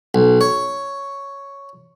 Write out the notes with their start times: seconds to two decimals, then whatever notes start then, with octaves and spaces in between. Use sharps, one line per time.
0.14 B1
0.41 C#5